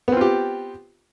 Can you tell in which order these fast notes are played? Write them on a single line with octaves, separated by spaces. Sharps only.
B3 C4 F4 G4